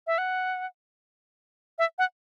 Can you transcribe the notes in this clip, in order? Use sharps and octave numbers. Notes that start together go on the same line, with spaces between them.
E5
F#5
E5
F#5